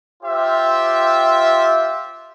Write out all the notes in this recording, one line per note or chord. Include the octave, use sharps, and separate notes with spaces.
F4 G4 C5 E5